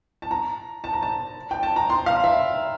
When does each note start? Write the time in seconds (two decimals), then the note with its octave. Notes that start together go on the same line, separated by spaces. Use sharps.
0.22 A5
0.31 A#5
0.84 A5
0.93 A#5
1.03 A5
1.51 G5
1.63 A5
1.76 A#5
1.90 C6
2.06 F5
2.24 E5